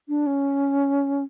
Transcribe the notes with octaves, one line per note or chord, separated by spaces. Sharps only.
D4
C#4